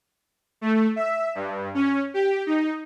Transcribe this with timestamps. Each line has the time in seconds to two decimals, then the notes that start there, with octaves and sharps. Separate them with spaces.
0.61 A3
0.96 E5
1.35 G2
1.75 C#4
2.14 G4
2.46 D#4